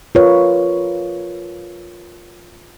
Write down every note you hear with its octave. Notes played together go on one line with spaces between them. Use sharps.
F4 A#4 B4 C#5